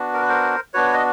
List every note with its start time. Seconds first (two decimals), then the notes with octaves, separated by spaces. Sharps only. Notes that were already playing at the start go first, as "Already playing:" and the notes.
Already playing: B3 D4 F#4
0.14 A#4
0.22 B4
0.29 A#4 C5
0.74 B3 D4 F#4 B4 C#5
0.93 D#5